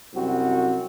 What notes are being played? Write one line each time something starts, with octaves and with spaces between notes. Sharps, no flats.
C2 F#2 C4 F#4